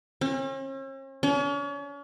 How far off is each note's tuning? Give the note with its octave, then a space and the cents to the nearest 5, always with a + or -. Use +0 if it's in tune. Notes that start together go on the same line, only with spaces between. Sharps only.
C#4 -45
C#4 +40